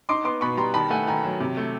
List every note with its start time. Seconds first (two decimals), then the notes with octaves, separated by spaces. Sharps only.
0.09 D#4 C6 D6
0.25 B3 C6 D6
0.41 B2 B5 C#6
0.57 G3 A#5 C6
0.74 D#3 A5 B5
0.90 A3 F#5 G#5
1.07 D#3 G#5 A#5
1.24 F#3
1.40 C3
1.57 A3